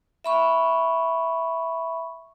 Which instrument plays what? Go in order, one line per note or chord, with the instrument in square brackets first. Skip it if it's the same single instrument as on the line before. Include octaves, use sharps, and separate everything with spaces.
[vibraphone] E5 B5 C#6